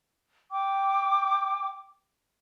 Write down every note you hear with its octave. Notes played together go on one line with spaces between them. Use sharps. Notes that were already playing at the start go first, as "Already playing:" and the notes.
G5 D6